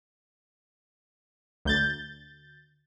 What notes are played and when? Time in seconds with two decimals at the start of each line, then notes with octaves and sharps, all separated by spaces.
1.65 D2 G6 A6